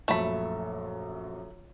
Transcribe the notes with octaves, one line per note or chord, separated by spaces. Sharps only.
A#1 F#2 A3 B5